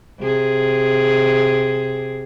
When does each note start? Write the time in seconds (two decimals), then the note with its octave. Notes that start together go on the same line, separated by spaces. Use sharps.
0.20 C3 G#4